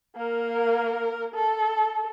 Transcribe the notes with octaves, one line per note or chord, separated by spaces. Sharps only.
A#3 A#4
A4